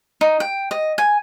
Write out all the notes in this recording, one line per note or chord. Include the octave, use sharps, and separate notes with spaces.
D#4
G5
D#5
G#5